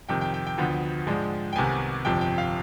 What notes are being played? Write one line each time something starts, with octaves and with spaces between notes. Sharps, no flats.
F2 C3 D#3 G5
G5
G5
G5
D2 D3 F3 B3
G#2 F3 G#3 D4
G5
C2 C3 D#3 B3 G#5
G1 F2 C3 F3 G5
G5
F5